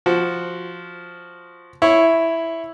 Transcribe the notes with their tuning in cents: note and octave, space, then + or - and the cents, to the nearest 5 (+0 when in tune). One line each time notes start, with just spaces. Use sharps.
F3 +0 F#4 +0
E4 +0 C#5 -5